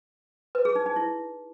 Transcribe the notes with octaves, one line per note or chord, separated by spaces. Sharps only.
B4
G#4
D#4
D#4
E4